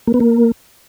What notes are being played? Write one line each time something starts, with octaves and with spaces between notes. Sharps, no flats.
A#3
B3
A#3